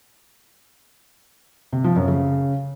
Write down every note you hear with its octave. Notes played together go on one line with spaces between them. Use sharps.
C3
F3
F#2
C#3